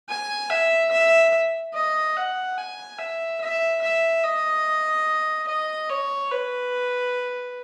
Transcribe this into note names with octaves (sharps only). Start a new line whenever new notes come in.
G#5
E5
E5
D#5
F#5
G#5
E5
E5
E5
D#5
D#5
C#5
B4